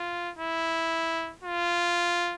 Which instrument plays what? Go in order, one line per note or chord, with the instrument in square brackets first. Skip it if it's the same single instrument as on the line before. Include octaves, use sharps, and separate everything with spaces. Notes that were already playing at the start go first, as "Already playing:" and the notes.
Already playing: [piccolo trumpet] F4
E4
F4